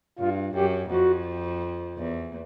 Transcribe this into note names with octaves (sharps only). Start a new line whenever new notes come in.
G2 F4
F#2 G4
F2 F#4
E2